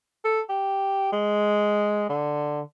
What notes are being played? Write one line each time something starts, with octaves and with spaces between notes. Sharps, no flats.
A4
G4
G#3
D3